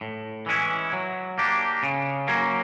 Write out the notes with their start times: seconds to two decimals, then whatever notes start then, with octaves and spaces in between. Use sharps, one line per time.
0.01 A2
0.46 E3 G#3 C#4 E4
0.93 F#3
1.38 A#3 D4 G4
1.83 C#3
2.28 F#3 A#3 C#4